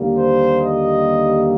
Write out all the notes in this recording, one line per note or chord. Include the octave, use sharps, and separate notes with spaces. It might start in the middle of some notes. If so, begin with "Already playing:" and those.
Already playing: D#2 D3 G3 A#3
C5
D#5